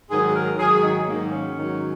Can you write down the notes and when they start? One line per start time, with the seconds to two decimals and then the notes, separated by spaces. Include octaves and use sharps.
0.10 G#2 D#3 F#3 G#4
0.27 G#4
0.35 A#4
0.58 G#2 D#3 F#3 G#4
0.83 D#4
1.07 G#2 D#3 F#3 A#3
1.32 C#4
1.56 G#2 D#3 F#3